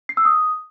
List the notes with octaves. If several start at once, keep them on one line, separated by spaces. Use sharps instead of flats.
C7
E6
D#6